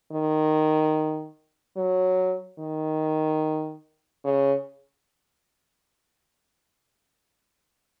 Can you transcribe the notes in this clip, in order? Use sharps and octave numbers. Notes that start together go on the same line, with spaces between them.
D#3
F#3
D#3
C#3